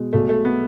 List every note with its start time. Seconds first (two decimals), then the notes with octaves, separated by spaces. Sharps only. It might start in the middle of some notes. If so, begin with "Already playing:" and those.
Already playing: B2 G#3
0.13 B1 A3
0.29 A3
0.45 B3